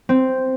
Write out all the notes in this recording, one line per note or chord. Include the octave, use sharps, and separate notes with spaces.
C4